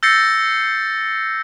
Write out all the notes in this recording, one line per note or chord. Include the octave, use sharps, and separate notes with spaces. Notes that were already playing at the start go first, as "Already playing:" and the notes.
E6 G6 A6 A#6 C7 C#7